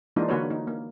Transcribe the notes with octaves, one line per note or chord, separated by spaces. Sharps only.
E3 G#3 A#3 D4 D#4 F4
D3 A#3 F#4 B4 C#5
A#3 D#4
A#3